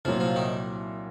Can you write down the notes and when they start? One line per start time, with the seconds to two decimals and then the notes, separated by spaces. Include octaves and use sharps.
0.05 C2 A#2 F3 F#3 F4
0.20 F3 F4
0.36 D#3 D#4